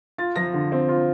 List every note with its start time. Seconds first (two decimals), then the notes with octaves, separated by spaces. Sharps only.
0.18 F4 A6
0.36 F3 A#6
0.54 D3
0.72 C4
0.88 F4